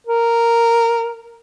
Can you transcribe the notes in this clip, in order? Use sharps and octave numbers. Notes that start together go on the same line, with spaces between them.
A#4